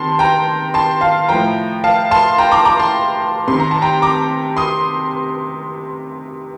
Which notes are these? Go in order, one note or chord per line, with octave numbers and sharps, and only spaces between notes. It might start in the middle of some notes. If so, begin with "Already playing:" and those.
Already playing: C3 D#3 A5 C6
G5 A#5
A5 C6
F5 A5
A2 F3 G5 A#5
F5 A5
A5 C6
G5 A#5
A#5 D6
A#5 D6
A5 C6
C3 D#3 C6
A#5
A5
G5 A#5
A#5 D6
C6 D#6